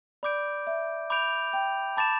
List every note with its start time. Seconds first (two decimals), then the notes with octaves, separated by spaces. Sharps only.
0.23 D5 B5 D6 G6 D7
0.67 E5
1.10 B5 D6 G6 D7 F7
1.53 G5
1.97 A5 B5 D6 A6 E7